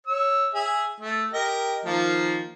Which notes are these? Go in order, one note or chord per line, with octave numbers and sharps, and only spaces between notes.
C#5 E6
G#4 E5
A3
G4 A#4 D#5
D#3 F3 A#3